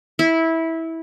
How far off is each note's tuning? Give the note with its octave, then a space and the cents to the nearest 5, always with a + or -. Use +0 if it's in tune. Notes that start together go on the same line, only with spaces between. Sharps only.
E4 -15